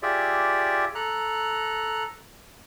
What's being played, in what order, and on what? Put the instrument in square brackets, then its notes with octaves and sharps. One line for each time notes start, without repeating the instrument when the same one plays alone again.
[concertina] F4 G4 G#4 D5 E5
A4 A#5 F#6